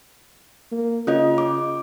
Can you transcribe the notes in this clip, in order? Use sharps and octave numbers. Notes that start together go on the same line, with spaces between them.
A#3
C#3 C#4 F4 D#5
D6